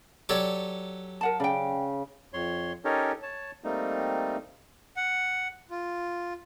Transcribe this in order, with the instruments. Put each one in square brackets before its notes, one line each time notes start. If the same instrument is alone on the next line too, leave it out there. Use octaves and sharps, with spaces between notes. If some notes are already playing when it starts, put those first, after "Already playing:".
[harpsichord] F#3 G4 A4 [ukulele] C#5 D5
[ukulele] A#4 F#5 A5
[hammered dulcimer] C#3 [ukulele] D5 G5
[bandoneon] F2 C#5 C6
C#4 D#4 G4 A4 A#4 C#5
C#5 A5
G3 A3 A#3 C4 D#4
[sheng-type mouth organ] F#5
F4